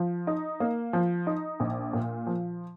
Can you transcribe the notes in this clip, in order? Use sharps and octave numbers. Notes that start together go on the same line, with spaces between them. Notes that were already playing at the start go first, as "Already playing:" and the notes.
Already playing: F3
D#4
A#3
F3
D#4
A#1
A#2
F3